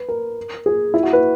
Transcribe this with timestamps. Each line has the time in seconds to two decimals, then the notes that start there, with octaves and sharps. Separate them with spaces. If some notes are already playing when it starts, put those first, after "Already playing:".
Already playing: B4
0.09 A#4
0.66 G#4
0.94 E4
1.03 F#4
1.13 B4